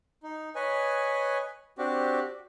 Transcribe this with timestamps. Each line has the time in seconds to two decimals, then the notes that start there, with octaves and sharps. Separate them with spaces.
0.23 D#4
0.55 B4 C#5 D#5 G#5
1.78 C4 D4 F#4 G4